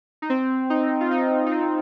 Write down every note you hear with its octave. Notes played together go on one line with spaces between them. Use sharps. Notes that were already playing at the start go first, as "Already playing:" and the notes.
D#4
C4
D#4
F4
D#4
D#4
C4